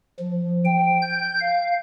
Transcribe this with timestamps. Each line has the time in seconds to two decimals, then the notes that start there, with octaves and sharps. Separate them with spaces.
0.20 F3
0.65 G5
1.02 G6
1.40 F5